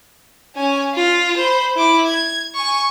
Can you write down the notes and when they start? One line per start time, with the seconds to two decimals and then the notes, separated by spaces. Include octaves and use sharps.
0.56 C#4 G#5
0.94 F4
1.38 C5 B5
1.77 E4 D6
2.06 G#6
2.55 G#5 C#6